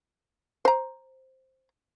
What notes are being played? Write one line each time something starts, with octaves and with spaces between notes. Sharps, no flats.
C5 A#5